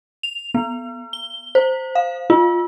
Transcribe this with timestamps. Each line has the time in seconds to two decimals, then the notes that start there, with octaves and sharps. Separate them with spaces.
0.23 F7
0.54 B3
1.13 G7
1.55 C5
1.95 F5
2.30 F4